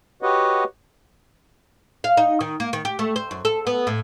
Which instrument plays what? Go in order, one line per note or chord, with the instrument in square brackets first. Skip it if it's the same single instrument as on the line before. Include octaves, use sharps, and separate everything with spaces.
[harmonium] F#4 G4 B4 C#5 D#5 F#5
[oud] F5
D#4
D#3
A#3
D#3
G4
A3
C5
F#2
A4
B3
A2